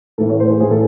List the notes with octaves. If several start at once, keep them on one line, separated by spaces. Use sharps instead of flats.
A2 E3 A4
C#5
C5
G#4
A2 E3 G#4
A4